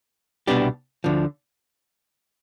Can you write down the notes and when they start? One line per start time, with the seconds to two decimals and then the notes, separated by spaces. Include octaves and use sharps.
0.47 C2 B2 B3 D4 G4
1.04 D2 D3 F3